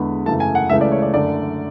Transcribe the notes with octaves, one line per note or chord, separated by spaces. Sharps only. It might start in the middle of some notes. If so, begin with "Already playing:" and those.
Already playing: E2 D3 G#3 B5
F#2 C#3 E3 A3 A5
G#5
F#5
C#2 C#3 E3 A3 E5
D5
C#5
D5
F#2 D3 A3 D5